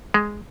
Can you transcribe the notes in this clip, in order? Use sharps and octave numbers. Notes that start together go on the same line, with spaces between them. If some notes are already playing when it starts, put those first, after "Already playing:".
G#3